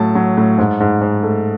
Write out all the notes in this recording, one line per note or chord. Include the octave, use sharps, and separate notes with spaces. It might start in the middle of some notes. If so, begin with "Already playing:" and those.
Already playing: A2 F#3 A5
F#3
A2
G#2
G#2
G#2
A3